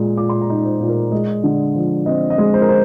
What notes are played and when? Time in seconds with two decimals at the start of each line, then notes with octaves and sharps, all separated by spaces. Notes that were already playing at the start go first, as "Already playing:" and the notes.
Already playing: A#2 G#3
0.17 A#2 D6
0.29 C6
0.41 A#5
0.50 D#4
0.65 C5
0.80 A#2
0.89 A#4
1.12 G#3 D#5
1.44 D3
1.75 F3
2.06 C4 D#5
2.30 D#5
2.38 G#3
2.54 C5
2.61 A#4
2.69 C5